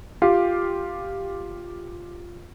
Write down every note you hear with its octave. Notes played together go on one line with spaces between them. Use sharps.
F4 G4 F5